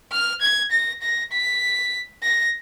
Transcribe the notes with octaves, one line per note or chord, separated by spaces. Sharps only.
F6
G#6
A#6
A#6
B6
A#6